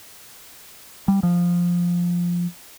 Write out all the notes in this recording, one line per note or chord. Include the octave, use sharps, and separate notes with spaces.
G3
F3